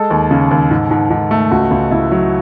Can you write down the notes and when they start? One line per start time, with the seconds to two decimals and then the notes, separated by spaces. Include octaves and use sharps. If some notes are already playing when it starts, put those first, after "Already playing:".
Already playing: G#3 A4
0.10 D#2
0.31 C#3
0.51 D#2
0.71 G#2
0.91 G#2
1.10 G#2
1.31 A3
1.51 C#2 F#4
1.71 C#2
1.91 C#2 E4
2.12 F#3